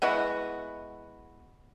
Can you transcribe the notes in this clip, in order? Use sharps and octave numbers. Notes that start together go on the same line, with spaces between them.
G#3 B3 E4 F#4